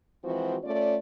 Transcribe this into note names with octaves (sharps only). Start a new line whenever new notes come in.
E3 F3 G#3 C4 F#4
A3 C#4 F4 D5